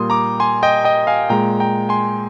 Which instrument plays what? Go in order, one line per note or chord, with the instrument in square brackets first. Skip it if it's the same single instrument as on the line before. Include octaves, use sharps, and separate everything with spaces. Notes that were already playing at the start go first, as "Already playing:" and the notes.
Already playing: [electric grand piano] A#2 G3 A#3 C6 D#6
A#5 D6
G#5 C6
D#5 G5
D#5 G5
F5 G#5
A#2 G#3 G5 A#5
G5 A#5
G#5 C6